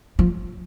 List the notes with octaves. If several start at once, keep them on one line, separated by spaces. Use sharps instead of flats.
F3